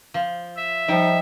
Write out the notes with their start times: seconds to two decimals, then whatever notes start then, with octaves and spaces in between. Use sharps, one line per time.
0.14 F3
0.56 E5
0.88 F3 G3 D#4